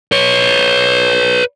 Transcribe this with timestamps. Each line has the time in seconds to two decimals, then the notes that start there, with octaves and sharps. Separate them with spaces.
0.12 B4 C#5